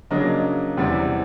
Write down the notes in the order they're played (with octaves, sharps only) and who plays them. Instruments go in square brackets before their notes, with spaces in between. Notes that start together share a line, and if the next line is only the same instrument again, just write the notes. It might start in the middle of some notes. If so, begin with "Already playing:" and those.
[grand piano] C#3 F#3 A#3 D4 D#5
E2 C3 E3 G3 C4